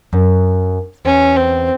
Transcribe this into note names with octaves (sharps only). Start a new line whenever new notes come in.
F#2
E2 C#4
C4